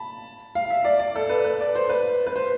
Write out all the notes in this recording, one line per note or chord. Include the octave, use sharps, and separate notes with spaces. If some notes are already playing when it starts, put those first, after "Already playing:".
Already playing: A5 B5
F5
E5
D5
D5
A4
B4
B4
D5
C5
B4
B4
C5